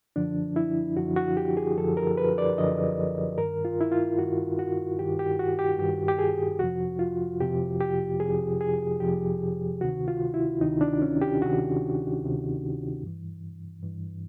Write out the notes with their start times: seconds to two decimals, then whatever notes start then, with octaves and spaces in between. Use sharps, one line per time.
0.16 F#2 D3 F3 D4
0.56 E4
0.96 F#2 D3 F3 F#4
1.16 F#4
1.37 G4
1.57 G#4
1.78 F#2 D3 F3 A4
1.97 A#4
2.17 B4
2.38 D5
2.58 F#2 D3 F3 D#5
3.38 G2 D#3 A#4
3.65 F4
3.81 E4
3.92 F4
4.18 G2 D#3 F#4
4.59 F#4
4.99 G2 D#3 G4
5.19 G4
5.39 F#4
5.59 G4
5.78 G2 D#3 G4
6.08 G4
6.19 G#4
6.59 F2 C3 F3 F#4
6.99 F4
7.40 F2 C3 F3 G4
7.81 G4
8.20 F2 C3 F3 G#4
8.61 G#4
9.00 F2 C3 F3 G4
9.81 D2 C3 D#3 F#4
10.08 F4
10.34 E4
10.61 D2 C3 D#3 D#4
10.81 D4
11.02 C#4
11.21 G4
11.42 D2 C3 D#3 F#4
12.23 D2 C3 D#3
13.03 G2 E3
13.82 G2 E3